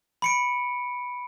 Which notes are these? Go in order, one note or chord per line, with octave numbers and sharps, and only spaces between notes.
B5 C#7 D7